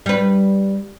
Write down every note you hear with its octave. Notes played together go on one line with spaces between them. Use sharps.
G3 B4